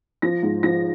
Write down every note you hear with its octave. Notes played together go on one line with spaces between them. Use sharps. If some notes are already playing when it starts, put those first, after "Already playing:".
F3 A#6
G#2
F3 A#6